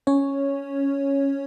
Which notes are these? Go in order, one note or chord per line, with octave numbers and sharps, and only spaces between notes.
C#4 C#5